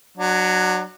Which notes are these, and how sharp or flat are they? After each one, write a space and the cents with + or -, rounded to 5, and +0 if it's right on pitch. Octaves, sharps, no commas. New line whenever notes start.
F#3 +0 D4 +30